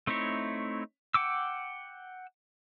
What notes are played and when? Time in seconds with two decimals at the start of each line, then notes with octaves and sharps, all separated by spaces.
0.07 A3 C4 D#4 E4 C#5
1.14 F#5 G5 D6 E6